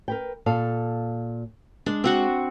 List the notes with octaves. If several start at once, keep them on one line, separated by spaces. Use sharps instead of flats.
A#4 B4 G5
A#2 A4 F5
G#3 D4
C4 F#4 F#5